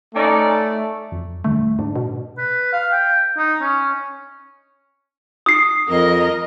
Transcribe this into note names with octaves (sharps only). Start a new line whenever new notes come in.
A3 C#4 D#4 D5
F2
D#1 D3 A3
G#2 D4
B2
B4
F5
G5
D#4
C#4
D#6 C7
F2 A#4 D#5